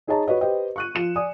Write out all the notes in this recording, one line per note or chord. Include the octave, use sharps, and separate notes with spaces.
D#4 G#4 C#5 D#5 A5 A#5
F#4 B4 C#5 D#5
G4 B4 C5 D#5 G5
C#6 F#6 D#7
F3 C#7 E7
D5 G#5 D#6